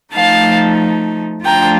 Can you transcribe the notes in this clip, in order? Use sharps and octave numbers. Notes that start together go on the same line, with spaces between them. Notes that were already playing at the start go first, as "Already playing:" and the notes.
F3 A3 D#4 F5 A5
F3 A3 D4 F4 G5 A#5